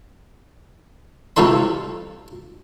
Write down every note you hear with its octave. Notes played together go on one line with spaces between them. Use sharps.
C2 C3 F4 A4 C#5 C6